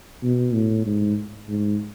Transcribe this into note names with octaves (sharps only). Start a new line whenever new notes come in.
B2
A2
G#2
G#2